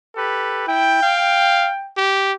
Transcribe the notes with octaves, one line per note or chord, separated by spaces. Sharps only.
G4 A4 B4
E4 G5
F5
G4